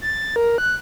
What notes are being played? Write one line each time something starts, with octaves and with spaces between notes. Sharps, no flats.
A6
A#4
F#6